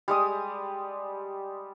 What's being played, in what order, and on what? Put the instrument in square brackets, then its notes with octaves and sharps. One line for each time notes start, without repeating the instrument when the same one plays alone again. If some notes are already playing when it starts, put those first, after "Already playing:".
[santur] G3 G#3 D#6